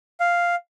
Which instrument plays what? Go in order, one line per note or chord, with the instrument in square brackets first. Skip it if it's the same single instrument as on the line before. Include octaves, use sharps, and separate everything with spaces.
[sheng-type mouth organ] F5